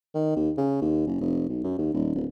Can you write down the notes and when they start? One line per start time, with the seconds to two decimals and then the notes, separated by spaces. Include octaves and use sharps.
0.14 D#3
0.36 D#2
0.58 C#3
0.82 D#2
1.07 F#1
1.21 F1
1.49 B1
1.64 F#2
1.78 D#2
1.94 D#1
2.15 D1